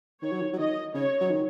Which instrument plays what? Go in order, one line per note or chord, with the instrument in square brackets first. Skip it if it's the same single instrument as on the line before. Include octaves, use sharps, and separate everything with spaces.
[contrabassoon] D#3 [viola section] C#5
[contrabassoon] F#3
D#3
F#3
[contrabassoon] D#3 [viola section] D#5
[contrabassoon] C#3 [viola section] C#5
[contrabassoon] F#3
D#3